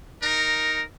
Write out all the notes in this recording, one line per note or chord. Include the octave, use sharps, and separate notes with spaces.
D#4 A#4